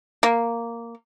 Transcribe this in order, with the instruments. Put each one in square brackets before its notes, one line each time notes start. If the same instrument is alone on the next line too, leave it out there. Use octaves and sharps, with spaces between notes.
[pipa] A#3